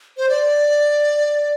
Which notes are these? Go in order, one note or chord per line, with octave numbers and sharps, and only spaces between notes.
C5
D5